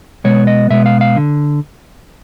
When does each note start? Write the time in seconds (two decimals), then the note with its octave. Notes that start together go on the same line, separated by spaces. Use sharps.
0.24 B2 G#3 B3 C#5
0.47 D#5
0.70 B2 G#3 B3 E5
0.86 F5
1.01 F5
1.16 D3